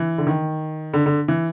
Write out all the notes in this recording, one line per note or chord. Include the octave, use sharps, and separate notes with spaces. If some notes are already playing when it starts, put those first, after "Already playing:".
Already playing: E3
D3
D#3
D3
D3
E3